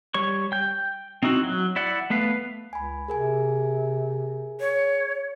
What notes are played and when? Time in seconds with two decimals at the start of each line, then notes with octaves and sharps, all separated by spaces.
0.14 G3 C#5 C#6
0.52 G5 G6
1.23 C4 D#4 E4 F#4
1.44 F#3
1.76 E4 D5 F#5
2.10 A3 B3 B4 F5
2.73 C#2 G#5 B5
3.08 C3 G#4 A#4 G#5
4.60 C#5